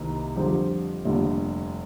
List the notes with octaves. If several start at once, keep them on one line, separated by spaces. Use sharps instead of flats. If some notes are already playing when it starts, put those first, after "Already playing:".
Already playing: C2 C3 D#3 A#3
F2 D3 G3 C4 G4
F1 D#2 D3 G3